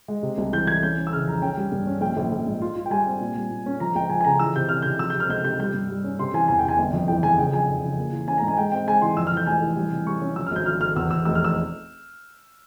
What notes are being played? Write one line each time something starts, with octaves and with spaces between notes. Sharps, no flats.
G#3
C3
C2
E3 G6
E3 G#6
C#4 G6
C#4
E6
C#3 F6
F2 A#5
C#4 G5
G3
G2
C#4
A#1 G5
A#1
A#1
G#2
F4
F4
G5
G3 G#5
C4
A#2
G3
A#2
C#4
F3 A#5
C#2 G5
F3 G#5
G#5
C#3 A#5
E3 E6
C3 G6
C3 F6
C3 G6
F3 E6
G6
C3
F6
C#2 G6
C3 G6
G3 G6
G2
G3
C#4
C3 C6
E3 G#5
E2 G#5
G5
C3
G#5
G1 G5
F2
E3 G5
F2 G#5
C#3 G5
F2 G#5
F2
C#3
A#3
E3
C#4 G#5
A#5
G#2
G#5
G#3 G5
C4 G5
G#3 G#5
E3 C6
F2 E6
F6
E3
G6
F1 G#5
E3
G3
C3
G3 C#6
C#4
F3 E6
F6
G#1 G6
F3 F6
G#1 F6
E2 E6
E2 E6
F1 E6
F6
E6